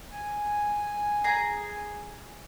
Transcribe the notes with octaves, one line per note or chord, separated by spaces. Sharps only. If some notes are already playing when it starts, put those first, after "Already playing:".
G#5
G#4 A#5